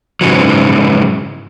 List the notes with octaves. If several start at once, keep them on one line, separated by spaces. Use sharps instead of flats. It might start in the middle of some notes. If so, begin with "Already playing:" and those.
G#2 C#3 E3 F#3